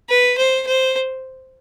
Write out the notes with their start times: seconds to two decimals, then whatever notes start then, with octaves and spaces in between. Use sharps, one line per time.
0.09 B4
0.38 C5
0.67 C5